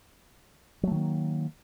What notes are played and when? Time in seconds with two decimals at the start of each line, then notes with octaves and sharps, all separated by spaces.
0.83 F#3
0.87 A3
0.91 D#3
0.96 A#3